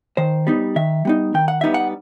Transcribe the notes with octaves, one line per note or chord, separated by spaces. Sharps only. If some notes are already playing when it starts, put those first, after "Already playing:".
D#3 C5
G3 B3 D#4
D#3 E5
G3 B3 D#4
D#3 G5
F#5
G3 B3 D#4 E5
F#5